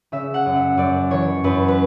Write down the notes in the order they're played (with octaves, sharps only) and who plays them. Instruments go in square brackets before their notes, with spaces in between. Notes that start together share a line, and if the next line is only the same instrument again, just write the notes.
[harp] C#3 E5
F#5
F#2
E5
F#2 D5
E3 C#5
F#2 B4
B4